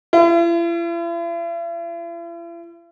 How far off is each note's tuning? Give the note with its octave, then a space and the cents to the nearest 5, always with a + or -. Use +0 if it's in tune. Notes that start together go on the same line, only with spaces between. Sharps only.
E4 +45